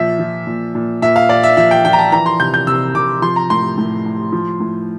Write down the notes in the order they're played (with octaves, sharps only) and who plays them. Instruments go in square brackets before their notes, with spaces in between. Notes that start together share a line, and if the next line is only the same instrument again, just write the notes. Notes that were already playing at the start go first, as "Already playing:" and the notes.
Already playing: [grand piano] A#2 F3 E5
F3
A#2
A#2
A#2 E5
F5
A#2 D5
E5
F3 E5
G5
F3 G5
A#5
A5
E3 A#5
C6
C3 G6
G6
C3 E6
C3 D6
F3 C6
A#5
A2 C6
A2
A2
F3
A2